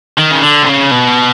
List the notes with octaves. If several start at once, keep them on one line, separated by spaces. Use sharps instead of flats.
D#3
C#3
D3
C3
C#3
B2